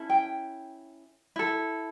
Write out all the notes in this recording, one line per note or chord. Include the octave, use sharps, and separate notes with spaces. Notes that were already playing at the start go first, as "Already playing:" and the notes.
Already playing: C#4 E4 A4
G5
E4 A4